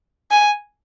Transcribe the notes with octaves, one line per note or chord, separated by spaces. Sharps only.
G#5